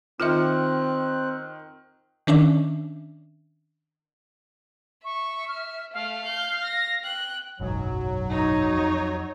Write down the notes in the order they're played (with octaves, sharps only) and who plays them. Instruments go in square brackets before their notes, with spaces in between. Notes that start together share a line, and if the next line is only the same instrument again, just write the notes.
[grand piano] D#3 F6 [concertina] C4 F#6 [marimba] F4 E5
[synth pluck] D#3 C#4 D4 E5
[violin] E5 [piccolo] C#6
[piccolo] F6
[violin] A3 [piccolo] F5
[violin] G6
A#6
G5 F#6
[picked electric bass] F#1 B1 G#2 [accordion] F#3
[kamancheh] D#4 C#5
[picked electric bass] F2